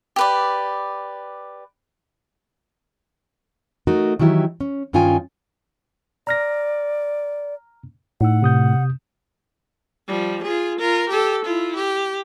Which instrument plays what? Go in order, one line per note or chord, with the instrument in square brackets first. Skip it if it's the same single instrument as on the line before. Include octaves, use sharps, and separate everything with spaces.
[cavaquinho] G4 B4 D5
[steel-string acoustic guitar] A3 D#4 F#4 A#4
D#3 E3 F#3 E4 G4
C#4
G2 D#3 C#4 F4 G5 G#5
[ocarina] D5 [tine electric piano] A#5 F6 A#6
[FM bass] A2 [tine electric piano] D#4 E6 [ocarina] F#5
[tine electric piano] C3 D#6 G6
[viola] F3 G3
F4 G#4
F4 A#4
G4 A4
E4 F4
G4